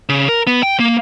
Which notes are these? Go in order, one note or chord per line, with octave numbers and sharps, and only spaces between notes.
C#3
A#4
B3
G5
A#3